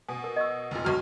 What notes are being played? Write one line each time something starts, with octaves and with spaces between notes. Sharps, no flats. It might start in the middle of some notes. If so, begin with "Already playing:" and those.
B2 G#5
A#4
D#5 C#6 E6
F1 A#2
B1 F#4 B4 C#6 F6